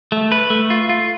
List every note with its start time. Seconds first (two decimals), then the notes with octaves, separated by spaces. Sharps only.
0.12 A3
0.32 B4
0.50 A3
0.70 F4
0.89 F4